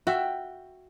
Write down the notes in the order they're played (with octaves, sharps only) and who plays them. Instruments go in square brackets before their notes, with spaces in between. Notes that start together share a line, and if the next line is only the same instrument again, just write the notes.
[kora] F#4 [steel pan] E5 [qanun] G5